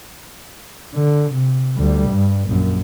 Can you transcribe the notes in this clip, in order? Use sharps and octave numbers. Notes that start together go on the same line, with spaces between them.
D3
C3
D2 G3
G2
A#1 F#2